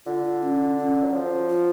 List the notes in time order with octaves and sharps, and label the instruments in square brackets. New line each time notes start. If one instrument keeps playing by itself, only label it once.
[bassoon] D3 [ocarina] F4
[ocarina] F4
C#4
C#4
[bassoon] F#3
F3
[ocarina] F4